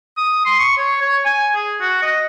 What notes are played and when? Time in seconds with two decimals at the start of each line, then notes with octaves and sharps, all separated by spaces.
0.17 D#6
0.46 C6
0.60 C#6
0.78 C#5
1.01 C#5
1.25 G#5
1.55 G#4
1.81 F#4
2.02 D#5